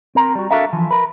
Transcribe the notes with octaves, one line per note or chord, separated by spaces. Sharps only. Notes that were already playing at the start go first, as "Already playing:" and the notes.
C4 A#4 A#5
G3 F#4
D4 F#4 A4 A#4 E5 F5
E3 F3
A#4 B4